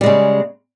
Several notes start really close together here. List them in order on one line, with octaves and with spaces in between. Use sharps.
G3 G#3 C#3